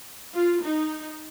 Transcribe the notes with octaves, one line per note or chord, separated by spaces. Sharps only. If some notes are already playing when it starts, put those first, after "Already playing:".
F4
D#4